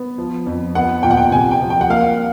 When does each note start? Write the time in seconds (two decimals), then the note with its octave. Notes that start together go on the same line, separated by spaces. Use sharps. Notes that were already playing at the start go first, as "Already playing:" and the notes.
Already playing: B3
0.18 F3
0.47 F2
0.75 B3 F#5
1.03 A#2 G5
1.11 F#5
1.17 G5
1.32 C3 G#5
1.51 G5
1.61 F3
1.70 G5
1.81 F#5
1.89 A#3 F5
2.00 F#5